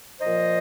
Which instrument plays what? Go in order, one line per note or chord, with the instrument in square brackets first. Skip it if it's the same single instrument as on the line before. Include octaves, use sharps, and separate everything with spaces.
[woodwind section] A#2 F3 C5 D#5